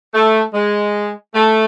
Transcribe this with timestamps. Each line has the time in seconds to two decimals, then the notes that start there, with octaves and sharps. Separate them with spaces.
0.14 A3
0.54 G#3
1.35 A3